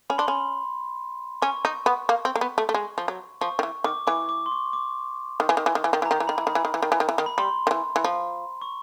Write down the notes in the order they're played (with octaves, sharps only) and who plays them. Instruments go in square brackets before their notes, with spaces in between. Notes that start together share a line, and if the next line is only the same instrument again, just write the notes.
[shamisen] C#4 [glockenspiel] B5
[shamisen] D4 [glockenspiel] C6
[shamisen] C#4 [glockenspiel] B5
[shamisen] C#4 [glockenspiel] C#6
[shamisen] D#4
B3
A#3
C4
A#3
B3
A3
A3
G#3
F3
F#3
[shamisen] F3 [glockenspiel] C#6
[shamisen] D#3
E3
[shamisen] D#3 [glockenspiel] D6
[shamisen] E3 [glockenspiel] D6
[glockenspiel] D6
C6
C#6
D6
[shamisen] D#3
E3
D#3
E3
D#3
E3
D#3
E3
[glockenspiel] A#5
[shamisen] D#3
E3
[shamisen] D#3 [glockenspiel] B5
[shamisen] E3
[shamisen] D#3 [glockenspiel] B5
[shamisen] E3
D#3
E3
D#3
E3
D#3
E3
D#3
[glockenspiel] B5
[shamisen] G3 [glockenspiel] C6
[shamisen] D#3
E3
E3
F3
[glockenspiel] C#6